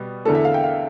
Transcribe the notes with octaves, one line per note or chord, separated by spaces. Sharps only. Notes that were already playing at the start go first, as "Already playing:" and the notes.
Already playing: B2 G3 B3
E2 D3 A3 A4
E5
F5
G5
F5